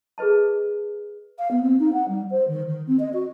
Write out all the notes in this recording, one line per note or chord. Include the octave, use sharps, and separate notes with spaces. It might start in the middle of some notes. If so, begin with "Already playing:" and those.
G#4 A4 B4 D#5 A5
F5
B3
C4
D#4
F#5
G3
C5
D#3
D#3
C4
D#5
F#4